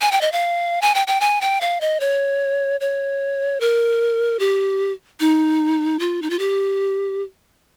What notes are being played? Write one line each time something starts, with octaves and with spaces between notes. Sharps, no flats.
G#5
G5
D#5
F5
G#5
G5
G5
G#5
G5
F5
D#5
C#5
C#5
A#4
G4
D#4
F4
D#4
F4
G4